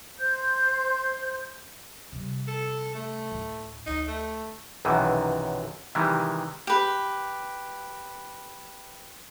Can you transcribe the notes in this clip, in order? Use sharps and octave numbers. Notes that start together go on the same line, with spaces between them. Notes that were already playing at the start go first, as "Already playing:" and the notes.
C5 G6
C3 G3
A4
A3
D2 A2
D2 D#4
A3
B1 F#2 C3 D#3 E3
C3 D#3 E3 G3 G#3
G4 B4